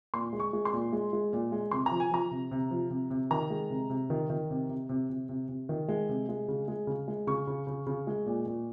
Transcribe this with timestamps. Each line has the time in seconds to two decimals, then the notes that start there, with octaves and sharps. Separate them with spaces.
0.14 A#2 C6
0.33 G#3
0.40 C#6
0.53 G#3
0.65 C6
0.73 A#2
0.93 G#3
1.13 G#3
1.33 A#2
1.52 G#3
1.71 C3 C6
1.86 A#5
1.92 F3
2.00 G#5
2.11 F3 A#5
2.31 C3
2.51 C3
2.71 F3
2.90 C3
3.11 C3
3.31 D#3 A#5
3.50 G#3
3.70 C3
3.90 C3
4.10 D#3
4.30 D#3
4.50 C3
4.69 C3
4.89 C3
5.10 C3
5.29 C3
5.48 C3
5.69 D#3
5.88 G#3
6.09 C3
6.29 G#3
6.48 C#3
6.68 G#3
6.87 C#3
7.08 G#3
7.27 C#3 C#6
7.47 C#3
7.67 C#3
7.87 C#3
8.07 G#3
8.26 A#2
8.46 A#2